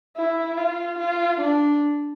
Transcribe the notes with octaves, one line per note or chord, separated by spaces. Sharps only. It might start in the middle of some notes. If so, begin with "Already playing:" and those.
E4
F4
F4
D4